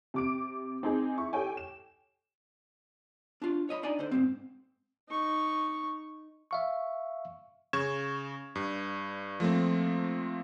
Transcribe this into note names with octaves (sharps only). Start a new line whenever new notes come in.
C3 D6 D7
C4 D#4 G#4
E4 C#6
G4 A4 C#5 G5 G#5
E7
D4 F4
C#5 D#5 B5
D4 D#4 D5 D#5 G#5 A#5
D3 C5
G#2 E3 C4
D#4 C#6
E5 F5 C#6
C#3 C#6 G#6 E7
G2
F3 A3 A#3 C4